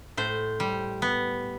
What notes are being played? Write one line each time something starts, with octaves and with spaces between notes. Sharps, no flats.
A2 C5
G3
B3